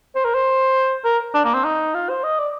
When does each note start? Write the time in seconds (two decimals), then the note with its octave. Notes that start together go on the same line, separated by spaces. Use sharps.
0.15 C5
0.25 A#4
0.34 C5
1.04 A#4
1.34 D4
1.45 A#3
1.54 C4
1.64 D#4
1.94 F4
2.09 C5
2.24 D#5
2.39 D5